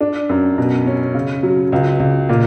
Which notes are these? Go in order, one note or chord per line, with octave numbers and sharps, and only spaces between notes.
D4
F#2
B2
C#4
C#3
F#3
C#2
C#2
A#2